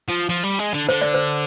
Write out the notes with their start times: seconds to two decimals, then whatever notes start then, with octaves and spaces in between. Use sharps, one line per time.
0.09 F3
0.29 F3
0.44 G3
0.59 G#3
0.74 D3
0.89 D3 C5
1.02 D5
1.14 C5